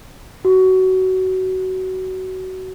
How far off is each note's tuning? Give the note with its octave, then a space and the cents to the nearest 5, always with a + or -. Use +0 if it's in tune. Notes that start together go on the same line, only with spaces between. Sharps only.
F#4 +20